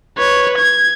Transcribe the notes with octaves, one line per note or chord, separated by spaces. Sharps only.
B4 C#5
G#6